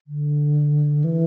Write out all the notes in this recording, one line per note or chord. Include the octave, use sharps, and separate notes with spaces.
D3
E3